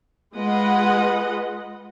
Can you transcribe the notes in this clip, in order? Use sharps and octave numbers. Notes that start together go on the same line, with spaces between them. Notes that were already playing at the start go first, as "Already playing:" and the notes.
G#3 F4 B4 D#5 F#5